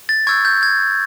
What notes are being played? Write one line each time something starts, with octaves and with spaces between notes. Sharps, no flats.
A6
C#6 E6 G6 G#6
G6
G#6